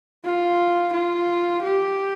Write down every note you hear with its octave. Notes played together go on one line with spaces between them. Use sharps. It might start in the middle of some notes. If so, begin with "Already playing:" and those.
F4
F4
G4